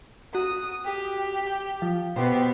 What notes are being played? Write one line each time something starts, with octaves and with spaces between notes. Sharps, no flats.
F#4 D#6
G4
G5
F3
B2 B3 G4 C5